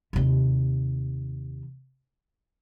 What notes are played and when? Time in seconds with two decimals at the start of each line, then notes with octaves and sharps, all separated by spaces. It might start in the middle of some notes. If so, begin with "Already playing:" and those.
0.13 D#2 C3